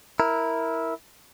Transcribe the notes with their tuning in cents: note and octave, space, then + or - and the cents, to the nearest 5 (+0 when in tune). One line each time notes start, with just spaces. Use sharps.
E4 -10 A#4 +0